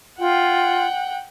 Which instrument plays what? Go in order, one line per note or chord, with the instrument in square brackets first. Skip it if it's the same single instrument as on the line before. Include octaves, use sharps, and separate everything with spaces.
[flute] F4 [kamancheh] F#5 G5